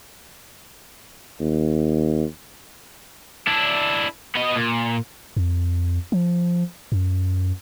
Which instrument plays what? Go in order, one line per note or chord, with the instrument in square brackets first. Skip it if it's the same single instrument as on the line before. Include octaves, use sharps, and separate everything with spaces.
[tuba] D#2
[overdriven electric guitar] D4 E4
B3 D#5
A#2
[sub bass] F2
F3
F#2